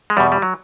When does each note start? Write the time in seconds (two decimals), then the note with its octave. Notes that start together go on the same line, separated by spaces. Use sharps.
0.10 G#3
0.17 E2 B2 G3
0.32 G3
0.42 F#3